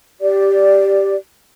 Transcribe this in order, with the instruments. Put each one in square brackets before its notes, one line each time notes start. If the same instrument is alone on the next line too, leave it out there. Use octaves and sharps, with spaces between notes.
[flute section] G4 D5